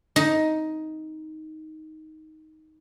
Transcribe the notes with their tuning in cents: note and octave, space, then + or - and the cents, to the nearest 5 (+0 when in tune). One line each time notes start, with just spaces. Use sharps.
D#4 +10